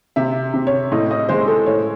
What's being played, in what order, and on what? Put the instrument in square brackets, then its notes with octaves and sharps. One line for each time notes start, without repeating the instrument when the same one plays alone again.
[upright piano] C3 E5
C3
C#5
A2 D#5
D#5
G#3 C5
A4
A2 C#5